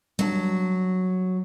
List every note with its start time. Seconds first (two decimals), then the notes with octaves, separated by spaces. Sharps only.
0.19 F#3 G3 A#3 D4